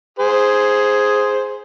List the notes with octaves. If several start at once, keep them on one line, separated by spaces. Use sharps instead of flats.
G#4 C5